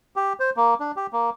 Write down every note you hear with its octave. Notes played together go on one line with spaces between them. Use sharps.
G4
C5
A#3
D4
G4
A#3